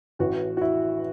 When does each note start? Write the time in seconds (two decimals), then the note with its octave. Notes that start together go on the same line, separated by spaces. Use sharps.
0.19 A1 A2 E3 F#4
0.57 F#4
0.61 E4